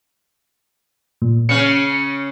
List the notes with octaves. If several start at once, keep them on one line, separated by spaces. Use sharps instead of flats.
A#2
C#3 C#4 C#7